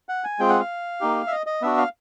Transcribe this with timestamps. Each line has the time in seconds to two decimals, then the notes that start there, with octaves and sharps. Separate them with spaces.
0.09 F#5
0.24 G#5
0.39 G#3 C4 F4 G#4 G5
0.49 F#5
0.60 F5
1.01 A#3 D#4 G4
1.27 E5
1.32 D#5
1.46 D#5
1.62 B3 D4 F#4 E5
1.78 F5